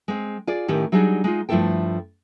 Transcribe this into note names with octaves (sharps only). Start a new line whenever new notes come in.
G#3 C4
F4 G#4 D5
A2 D#3 C#4 G4
F#3 G3 D4 D#4 G#4
G#3 D#4 F4
G2 F3 A3 E4 A4 G5